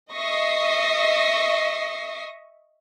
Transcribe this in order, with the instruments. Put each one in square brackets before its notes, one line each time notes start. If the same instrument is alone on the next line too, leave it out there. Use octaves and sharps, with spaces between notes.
[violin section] D#5 E5 C#6 D#6 A#6 C7